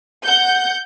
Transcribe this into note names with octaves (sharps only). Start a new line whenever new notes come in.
F#5 G6